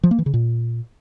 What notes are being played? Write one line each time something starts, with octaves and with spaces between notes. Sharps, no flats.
F3
A#3
E3
C#3
A#2